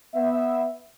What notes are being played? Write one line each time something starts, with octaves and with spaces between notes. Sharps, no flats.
B3 E5